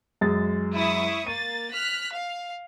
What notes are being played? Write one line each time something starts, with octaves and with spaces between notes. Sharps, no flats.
F#2 G#3 A6
E4 C#6 D#6
A#3 A6 D#7
F6 F#6 B6
F5